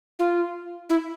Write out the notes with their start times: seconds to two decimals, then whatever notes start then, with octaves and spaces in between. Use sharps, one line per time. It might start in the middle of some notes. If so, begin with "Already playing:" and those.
0.19 F4
0.90 E4